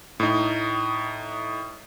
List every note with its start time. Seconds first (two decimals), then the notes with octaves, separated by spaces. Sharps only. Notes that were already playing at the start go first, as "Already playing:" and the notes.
0.20 A2 D#4